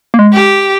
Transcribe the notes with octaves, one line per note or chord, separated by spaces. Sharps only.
A#3
G#3
G4